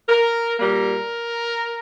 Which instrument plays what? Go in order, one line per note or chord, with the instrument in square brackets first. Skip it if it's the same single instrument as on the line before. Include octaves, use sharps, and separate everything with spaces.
[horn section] A#4
A#2 G3 A#3 A#4